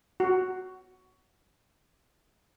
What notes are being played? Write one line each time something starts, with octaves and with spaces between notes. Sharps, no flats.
F#4